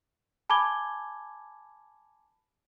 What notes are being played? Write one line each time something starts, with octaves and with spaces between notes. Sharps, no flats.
G#5 A5 B5 D6 G#6 G7